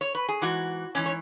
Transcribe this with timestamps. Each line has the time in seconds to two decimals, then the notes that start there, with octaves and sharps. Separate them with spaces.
0.01 C#5
0.15 B4
0.29 G#4
0.42 G#2 E3 F#4
0.95 G#2 E3 C#4
1.06 C#5